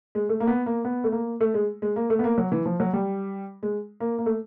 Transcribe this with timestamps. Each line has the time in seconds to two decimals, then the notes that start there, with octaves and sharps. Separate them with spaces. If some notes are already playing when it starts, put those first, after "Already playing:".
0.15 G#3
0.29 A3
0.40 A#3
0.47 B3
0.66 A#3
0.85 B3
1.04 A3
1.12 A#3
1.41 A3
1.54 G#3
1.82 G#3
1.96 A#3
2.10 A3
2.19 B3
2.24 A#3
2.38 F#3
2.52 E3
2.66 F3
2.80 F#3
2.93 G3
3.63 G#3
4.00 A#3
4.19 A#3
4.26 A3